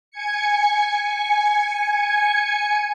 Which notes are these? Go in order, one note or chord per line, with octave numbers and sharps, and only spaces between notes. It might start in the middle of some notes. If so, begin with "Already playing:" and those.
G#5 G#6 C#7